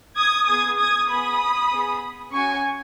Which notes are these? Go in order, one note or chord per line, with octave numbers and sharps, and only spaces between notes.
D#6 G#6
B3 G#4 D#6 G#6
D#6 G#6
B3 G#4 B5 D#6
B3 G#4
C#4 F#4 G#5 C#6